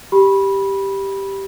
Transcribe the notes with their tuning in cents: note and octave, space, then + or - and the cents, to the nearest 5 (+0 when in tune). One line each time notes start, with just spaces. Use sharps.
G4 +0 B5 -15